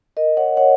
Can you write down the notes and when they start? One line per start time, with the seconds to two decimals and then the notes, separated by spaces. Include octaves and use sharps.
0.17 A#4 D#5
0.37 C#5 F#5
0.57 C#5 F#5